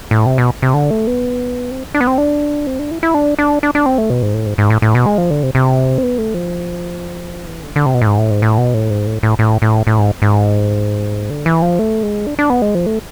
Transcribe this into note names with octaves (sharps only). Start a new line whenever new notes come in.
A2
C3
B2
C3
D3
A3
B3
C4
D4
B3
C4
D4
C4
D4
E4
E4
D4
D4
D4
D4
C4
A3
B2
G#2
A2
G#2
G#2
A2
A2
B2
G#3
F3
D3
C3
C3
C4
B3
A3
F3
E3
D3
D3
C3
B2
A2
G#2
A2
G#2
A2
B2
A2
G#2
A2
A2
A2
A2
A2
G#2
G#2
D3
E3
F3
A3
G#3
D4
D4
B3
G#3
F3
A3